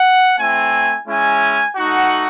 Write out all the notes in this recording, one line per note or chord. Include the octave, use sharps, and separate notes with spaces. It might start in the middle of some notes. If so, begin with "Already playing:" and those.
Already playing: F#5
A3 C4 E4 G#5
G#3 C#4 E4 G#5
A3 D#4 F#4 F#5